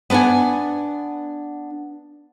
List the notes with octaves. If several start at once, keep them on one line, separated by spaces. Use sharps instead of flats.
B3 D4 B4 F#5 G#5